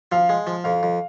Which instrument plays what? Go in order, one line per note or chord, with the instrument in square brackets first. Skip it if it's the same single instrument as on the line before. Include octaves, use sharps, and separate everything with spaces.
[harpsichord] F3 [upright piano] F5
[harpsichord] G#3
F3
[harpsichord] F2 [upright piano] F5
[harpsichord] F2